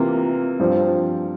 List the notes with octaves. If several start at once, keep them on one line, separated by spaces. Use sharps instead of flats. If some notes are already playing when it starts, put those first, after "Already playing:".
Already playing: C3 E3 A#3 F4
G2 F3 C4